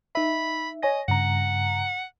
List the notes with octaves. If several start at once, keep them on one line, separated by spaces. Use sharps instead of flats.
D#4 E5 B5
C#5 D#5 G#5 A#6
G2 C#3 F#5 A#5